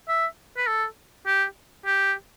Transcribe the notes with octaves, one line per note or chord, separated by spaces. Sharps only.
E5
B4
A4
G4
G4